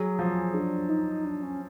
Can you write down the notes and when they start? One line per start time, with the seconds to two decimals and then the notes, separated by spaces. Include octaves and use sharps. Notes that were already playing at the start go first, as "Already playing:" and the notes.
Already playing: F#3 G#4
0.19 F3
0.54 D4
0.89 D#4
1.25 D4
1.43 C#4